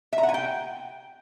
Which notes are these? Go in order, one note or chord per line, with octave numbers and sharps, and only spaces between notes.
E5
A#5
F#5
G#5
G5